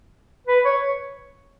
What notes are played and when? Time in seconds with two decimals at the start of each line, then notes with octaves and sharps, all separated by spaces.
0.47 B4
0.65 C#5